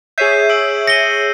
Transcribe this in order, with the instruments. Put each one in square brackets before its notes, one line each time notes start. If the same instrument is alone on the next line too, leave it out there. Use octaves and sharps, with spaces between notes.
[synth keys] G#4 C#5 E5 [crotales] G6 C7 D#7
[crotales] E6 D7 F#7
[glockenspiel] A#6 G7 [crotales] C#7 D#7